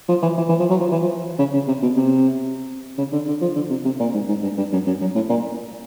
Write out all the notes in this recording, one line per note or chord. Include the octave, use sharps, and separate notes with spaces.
F3
E3
E3
E3
F3
F#3
F3
E3
F3
C#3
C#3
C3
B2
C3
C#3
D3
D3
F3
D3
C3
C3
A#2
G#2
G#2
G2
G2
F#2
F#2
F#2
A2
A#2